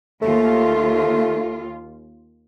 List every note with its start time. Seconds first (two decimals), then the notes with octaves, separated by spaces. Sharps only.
0.22 D#2 A3 F4